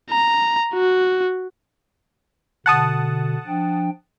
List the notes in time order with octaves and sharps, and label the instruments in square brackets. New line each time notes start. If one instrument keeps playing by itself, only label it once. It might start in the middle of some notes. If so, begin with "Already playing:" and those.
[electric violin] A#5
F#4
[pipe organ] B2 D3 [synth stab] F#5 A5 D#6
[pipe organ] F3 D4 G5